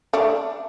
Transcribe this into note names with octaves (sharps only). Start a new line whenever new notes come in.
A3 D4